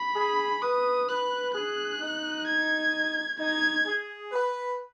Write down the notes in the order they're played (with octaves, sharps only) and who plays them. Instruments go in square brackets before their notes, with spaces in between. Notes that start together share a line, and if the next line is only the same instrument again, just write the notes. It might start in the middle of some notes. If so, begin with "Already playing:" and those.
Already playing: [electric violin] B5
[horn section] G#4
[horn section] B4 [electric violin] D#6
[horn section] B4 [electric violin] F#6
[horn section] G#4 [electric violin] F#6
[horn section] D#4
[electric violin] G#6
[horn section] D#4 [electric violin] G#6
[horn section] G#4
B4